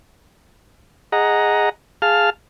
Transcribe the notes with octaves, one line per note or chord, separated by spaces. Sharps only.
G#4 D#5 F#5 A#5
G#4 F5 A5 F6